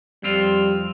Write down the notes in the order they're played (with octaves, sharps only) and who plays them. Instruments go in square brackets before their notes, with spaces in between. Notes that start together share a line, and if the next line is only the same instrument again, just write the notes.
[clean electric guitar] F2 C4 F4 [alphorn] G3